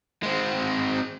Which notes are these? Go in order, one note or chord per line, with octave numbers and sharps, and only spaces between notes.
G#3 C4